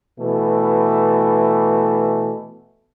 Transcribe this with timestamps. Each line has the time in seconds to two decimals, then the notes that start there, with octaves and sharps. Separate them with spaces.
0.19 B2 E3 A3